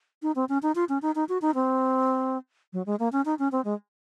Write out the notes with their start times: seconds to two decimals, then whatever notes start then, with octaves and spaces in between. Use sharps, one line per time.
0.23 D#4
0.36 C4
0.49 C#4
0.63 D#4
0.75 F4
0.89 C#4
1.02 D#4
1.15 D#4
1.29 F#4
1.42 D#4
1.55 C4
2.73 F#3
2.86 G#3
2.99 A#3
3.12 C#4
3.25 D#4
3.39 C#4
3.52 C4
3.65 G#3